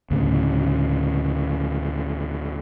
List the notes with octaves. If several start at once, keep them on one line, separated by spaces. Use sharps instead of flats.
D2 A2 C#3